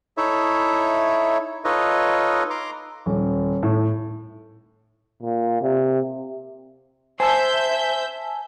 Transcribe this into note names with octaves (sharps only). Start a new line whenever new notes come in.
D#4 E4 A4 C#5 E5
D#4 F4 A4 B4 C#5 D#5
A#5 C6 D6
D#1
A2
A#2
C3
C5 E5 G#5 A5 E6 G6